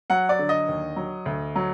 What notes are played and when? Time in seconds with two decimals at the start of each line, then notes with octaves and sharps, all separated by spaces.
0.10 F#3 F#5
0.29 D5
0.39 D3
0.49 D#5
0.68 D#2
0.96 F#3
1.26 D2
1.55 F#3